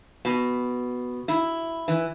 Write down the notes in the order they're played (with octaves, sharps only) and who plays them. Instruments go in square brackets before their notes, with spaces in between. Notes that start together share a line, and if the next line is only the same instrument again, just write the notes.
[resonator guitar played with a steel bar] B2
E4
E3